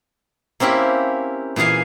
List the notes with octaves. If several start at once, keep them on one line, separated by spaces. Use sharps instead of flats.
A#3 C4 C#4 E4 G4
A#2 E3 G#4 F5 G#5